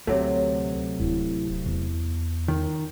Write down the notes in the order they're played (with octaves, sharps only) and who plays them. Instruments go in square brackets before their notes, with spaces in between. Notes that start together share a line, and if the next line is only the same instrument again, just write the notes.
[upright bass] D2 [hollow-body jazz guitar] C3 F#3 A3
[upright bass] D1 E4
E2
[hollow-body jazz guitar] D#3